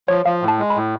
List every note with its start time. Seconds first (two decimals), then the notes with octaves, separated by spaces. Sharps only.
0.08 F3 C#5
0.25 F3 F5
0.42 A2
0.48 A5
0.59 G#3
0.70 B5
0.76 A2